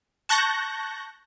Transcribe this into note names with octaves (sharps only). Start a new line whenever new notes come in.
A5 C#6 F#6 G6 A#6